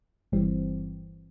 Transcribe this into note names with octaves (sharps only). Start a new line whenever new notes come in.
G1 G2 E3 G3 C4